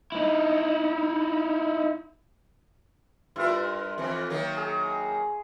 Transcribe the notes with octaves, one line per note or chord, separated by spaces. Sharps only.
D#4 E4
G2 E4 F4 A#4 E5
F2 E3
D#3 F#3 A#3
G#4